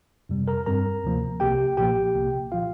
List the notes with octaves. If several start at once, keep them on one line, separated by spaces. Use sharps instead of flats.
F2 C3 G3
A#4 A#5
G2 G3 C4 A#4 A#5
D2 C3 F3 A#3
C2 C3 A#3 G4 G5
A#1 A#2 F3 A#3 G4 G5
C2 C3 A#3
A#2 F3 F4 F5